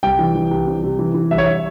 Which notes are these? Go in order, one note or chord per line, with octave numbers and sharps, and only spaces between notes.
C2 G5
E3
E3
C2
C3
C3
E3
E3
C2 E5
C#5
E5